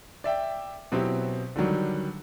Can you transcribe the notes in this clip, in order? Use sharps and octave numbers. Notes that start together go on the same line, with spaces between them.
D5 E5 G5
B2 F#3 C4 E4 G4
D3 D#3 F#3 G3